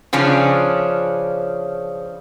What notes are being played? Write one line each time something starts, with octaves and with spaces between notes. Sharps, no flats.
C#3 F3 C#4 D4